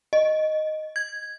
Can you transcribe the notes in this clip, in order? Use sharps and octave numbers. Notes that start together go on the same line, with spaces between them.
D#5
G#6